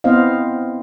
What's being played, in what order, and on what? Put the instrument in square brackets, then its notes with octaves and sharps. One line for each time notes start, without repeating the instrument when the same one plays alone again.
[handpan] B3 C4 E4 C5 D#5 F5